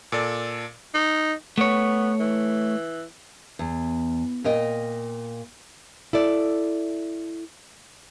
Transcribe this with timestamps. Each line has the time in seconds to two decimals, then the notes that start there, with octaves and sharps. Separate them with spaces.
0.12 A#2 A4 D5
0.94 D#4
1.58 A3 B3 C#5
2.20 E3
3.59 E2
4.44 A#2 A#4 D#5 G5
6.13 E4 A4 D5